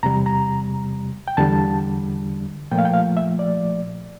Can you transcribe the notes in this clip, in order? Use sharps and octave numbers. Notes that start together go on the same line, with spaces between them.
E2 C3 G3 A#5
A#5
G5
E2 D3 G3 A5
A#2 F3 A3 G5
F5
G5
F5
E5
D5